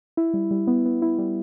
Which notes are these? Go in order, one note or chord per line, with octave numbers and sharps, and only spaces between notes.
E4
G3
G3
B3
B3
E4
G3